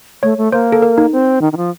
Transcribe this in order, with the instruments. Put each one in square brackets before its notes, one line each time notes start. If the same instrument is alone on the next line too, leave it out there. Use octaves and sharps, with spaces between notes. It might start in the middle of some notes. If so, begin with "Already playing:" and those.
[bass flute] A3 [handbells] C#5
[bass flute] A3
[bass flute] A#3 [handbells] C5
[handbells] A4
A#4
D#4
[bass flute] C4
D#3
D#3
F3